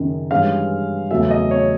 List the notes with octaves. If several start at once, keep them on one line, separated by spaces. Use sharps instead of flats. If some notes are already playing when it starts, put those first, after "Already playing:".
Already playing: F#1 F#2 D#3
G2 E3 G#3 C#4 F5
E2 C#3 F#3 A3 C#4 E5
D#5
C#5